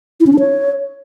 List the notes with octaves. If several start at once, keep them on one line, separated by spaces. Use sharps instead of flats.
E4
C#4
D4
C#5